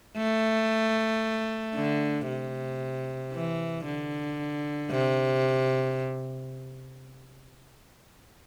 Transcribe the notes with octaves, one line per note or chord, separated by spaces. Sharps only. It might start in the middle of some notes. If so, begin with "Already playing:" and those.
A3
D3
C3
E3
D3
C3